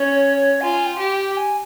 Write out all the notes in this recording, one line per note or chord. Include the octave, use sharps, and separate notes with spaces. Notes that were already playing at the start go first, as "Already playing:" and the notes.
Already playing: C#4 C#5
F4 G#5
G5
G4
G5
G#5